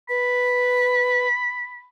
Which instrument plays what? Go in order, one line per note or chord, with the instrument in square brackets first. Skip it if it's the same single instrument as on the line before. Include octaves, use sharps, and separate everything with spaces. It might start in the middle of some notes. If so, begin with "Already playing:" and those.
[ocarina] B4 [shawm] B5